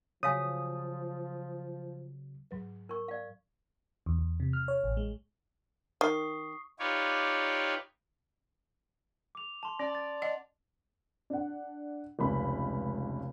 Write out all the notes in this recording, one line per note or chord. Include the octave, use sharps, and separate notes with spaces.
C#3 F3 F#3 C#5 F5 G#5 D#6
G#2 F#3 B4
A#4 C#6
D5 F5
E2
E2
C3
F6
C#5
A1
G#3
D#3 C#6 D#6 C7
D#4 F4 G4 B4 C#5 D5
D6 F7
A5 C6
C#4 D5
A6
D#5 F#5
D4 F#5
F1 C#2 B5